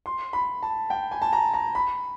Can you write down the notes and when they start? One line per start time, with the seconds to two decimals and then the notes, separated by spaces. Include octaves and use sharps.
0.06 C6
0.33 B5
0.63 A5
0.90 G5
1.12 G#5
1.22 A5
1.33 A#5
1.54 A#5
1.75 B5